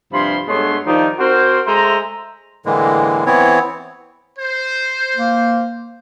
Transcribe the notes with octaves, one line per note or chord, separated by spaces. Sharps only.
G2 C3 F3 B5 C6
G2 G#3 A3 B3 C#5 C6
D#3 F3 G3 D#4
C4 F#4 A#4 C5
G#3 A3 C5 E5 A#5
A2 D3 E3 G#3 A#3
E3 B3 C4 E4 C#5
C5
A#3